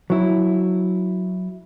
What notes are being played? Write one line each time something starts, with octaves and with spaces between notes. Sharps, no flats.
F#3 E4